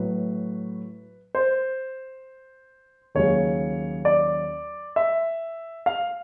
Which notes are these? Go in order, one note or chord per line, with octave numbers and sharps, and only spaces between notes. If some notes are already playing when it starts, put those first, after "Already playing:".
Already playing: A2 F#3 B4
C5
D#2 C#3 F#3 C#5
D5
E5
F5